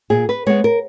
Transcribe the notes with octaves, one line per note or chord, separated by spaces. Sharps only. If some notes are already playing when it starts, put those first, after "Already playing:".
A#2 G#4
B4
G#3 B3 C#5
A#4